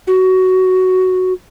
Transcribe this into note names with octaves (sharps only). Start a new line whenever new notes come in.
F#4